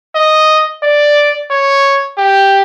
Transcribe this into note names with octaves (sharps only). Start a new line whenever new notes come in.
D#5
D5
C#5
G4